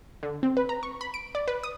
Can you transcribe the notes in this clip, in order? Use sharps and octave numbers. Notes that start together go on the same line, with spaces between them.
D3
C4
B4
A#5
C#6
B5
D7
D5
B4
D#6